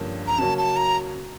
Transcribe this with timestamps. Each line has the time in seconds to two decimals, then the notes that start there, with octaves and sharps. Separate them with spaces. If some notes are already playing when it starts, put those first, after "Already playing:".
Already playing: G2 D3 F3 A#3 C#4
0.27 A#5
0.38 C#3 F#3 A#3 C#4 F#4 A5
0.58 A5
0.77 A#5